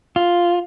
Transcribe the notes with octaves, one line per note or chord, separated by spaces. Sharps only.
F4